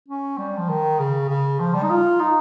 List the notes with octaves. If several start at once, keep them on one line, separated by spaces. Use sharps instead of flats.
C#4
G3
F3
D#3
C#3
C#3
F3
G3
D#4
F4
D#4